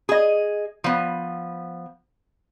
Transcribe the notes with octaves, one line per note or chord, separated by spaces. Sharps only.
G#4 D#5
F3 B3